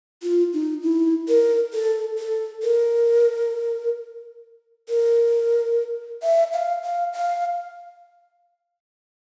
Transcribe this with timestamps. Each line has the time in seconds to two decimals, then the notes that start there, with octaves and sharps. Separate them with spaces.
0.23 F4
0.53 D#4
0.83 E4
1.28 A#4
1.73 A4
2.18 A4
2.63 A#4
4.89 A#4
6.23 E5
6.53 F5
6.83 F5
7.13 F5